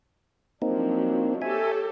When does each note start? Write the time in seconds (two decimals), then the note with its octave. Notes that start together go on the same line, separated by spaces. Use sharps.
0.62 F3 F#3 A#3 C4 D4 D#4
1.42 G4 A4 C#5 E5 G#5